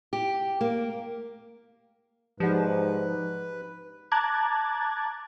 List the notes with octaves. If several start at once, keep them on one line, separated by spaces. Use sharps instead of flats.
G4
A#3
G#2 F3 G4 B4 D5 F#5
A5 A#5 D6 F#6 G#6 A6